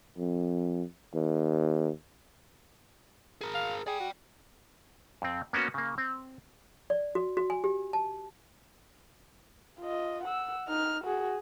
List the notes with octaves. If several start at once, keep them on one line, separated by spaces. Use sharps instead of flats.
F2
D#2
G#4 A#4
F5
G#4 D5 G5
F#4
F2 C4
A#3 B3 C#4 F#4
C#3 A#3
C4
D5
F#4
F#4
G#5
G4
A5
F4 D#5
F#5 E6
D#4 F6
F#4 G#4